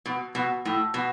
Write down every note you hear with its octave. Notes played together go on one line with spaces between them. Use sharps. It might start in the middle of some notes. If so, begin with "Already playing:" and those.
B2
B2
A2
B2